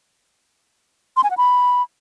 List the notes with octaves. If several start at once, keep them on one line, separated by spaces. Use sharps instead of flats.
C6
G#5
F#5
B5